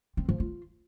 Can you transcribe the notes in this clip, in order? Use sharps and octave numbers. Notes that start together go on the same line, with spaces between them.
C4
F3
F4